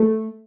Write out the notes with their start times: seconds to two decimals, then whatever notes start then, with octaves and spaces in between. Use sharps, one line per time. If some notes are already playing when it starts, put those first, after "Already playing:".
Already playing: A3